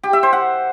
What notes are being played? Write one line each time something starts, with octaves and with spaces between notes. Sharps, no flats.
G4
E5
C5
F#5